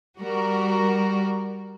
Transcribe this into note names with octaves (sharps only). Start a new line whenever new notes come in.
G3 F#4 A#4